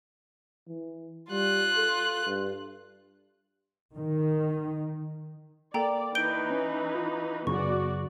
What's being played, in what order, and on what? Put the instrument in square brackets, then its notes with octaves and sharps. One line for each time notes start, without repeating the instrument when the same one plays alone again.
[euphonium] E3
[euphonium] G3 [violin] F4 F#6
[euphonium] A4
G2
[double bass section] D#3
[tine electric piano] A#3 [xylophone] A4 G5 A#5 [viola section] D5
[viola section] E3 D#4 B4 [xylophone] G6 D7 G7
[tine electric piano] C#4
F4
[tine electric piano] F#2 C#3 C#4 [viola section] B3 F#4 D5 [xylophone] C#6